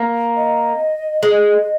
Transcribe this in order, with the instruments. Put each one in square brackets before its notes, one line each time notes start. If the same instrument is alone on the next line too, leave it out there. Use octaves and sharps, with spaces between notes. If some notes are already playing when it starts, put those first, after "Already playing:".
Already playing: [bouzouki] A#3
[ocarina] D#5
[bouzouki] G#3